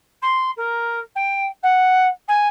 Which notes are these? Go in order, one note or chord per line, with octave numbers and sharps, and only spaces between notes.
C6
A#4
G5
F#5
G#5